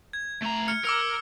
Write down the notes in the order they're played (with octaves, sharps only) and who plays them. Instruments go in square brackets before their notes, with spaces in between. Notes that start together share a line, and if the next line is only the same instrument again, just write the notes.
[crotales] G#6
[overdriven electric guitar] A3 A#5
[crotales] F6 C#7
[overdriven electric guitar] A#4 [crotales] D6 E6 C#7